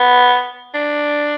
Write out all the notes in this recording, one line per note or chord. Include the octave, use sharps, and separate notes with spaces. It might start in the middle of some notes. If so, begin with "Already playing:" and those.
Already playing: B3
D4